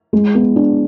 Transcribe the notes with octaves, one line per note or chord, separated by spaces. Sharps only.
G#3
B3
D4